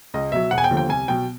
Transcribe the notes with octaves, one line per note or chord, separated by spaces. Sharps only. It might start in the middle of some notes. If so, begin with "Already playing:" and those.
C#2 D#5
B2 F#3 E5
E1 F#5
G#5
G5
D#2 D3 F3
G5
C2 G#5
B2 F#3 G5